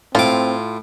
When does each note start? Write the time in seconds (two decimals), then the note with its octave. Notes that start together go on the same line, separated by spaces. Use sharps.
0.15 A2 C4 F4 D6